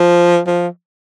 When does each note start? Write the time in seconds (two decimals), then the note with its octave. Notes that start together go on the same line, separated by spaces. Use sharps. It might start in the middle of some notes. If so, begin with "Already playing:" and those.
Already playing: F3
0.47 F3